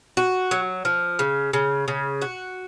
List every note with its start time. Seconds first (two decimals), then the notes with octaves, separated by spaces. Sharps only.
0.17 F#4
0.51 F#3
0.85 F3
1.19 C#3
1.53 C#3
1.88 C#3
2.22 F#4